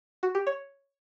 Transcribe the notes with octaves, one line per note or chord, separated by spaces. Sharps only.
F#4
G4
C#5